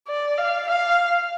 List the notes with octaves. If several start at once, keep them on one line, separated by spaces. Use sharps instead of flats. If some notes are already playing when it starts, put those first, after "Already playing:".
D5
F5
F5